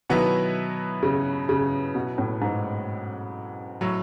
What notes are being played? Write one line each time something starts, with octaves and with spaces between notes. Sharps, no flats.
B2 D#3 F#3 B3 E4 B4
C#3
C#3
B2
A2
G#2
A2 F#3